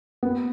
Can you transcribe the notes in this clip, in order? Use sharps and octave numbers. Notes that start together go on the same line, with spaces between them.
B3